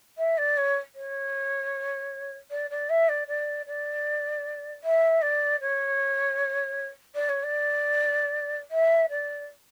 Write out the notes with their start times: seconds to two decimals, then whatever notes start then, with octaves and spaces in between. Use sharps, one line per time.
0.18 E5
0.38 D5
0.57 C#5
0.95 C#5
2.51 D5
2.70 D5
2.90 E5
3.09 D5
3.28 D5
3.66 D5
4.84 E5
5.22 D5
5.61 C#5
7.15 D5
7.29 C#5
7.43 D5
8.71 E5
9.09 D5